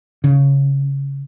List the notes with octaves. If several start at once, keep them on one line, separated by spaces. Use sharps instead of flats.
C#3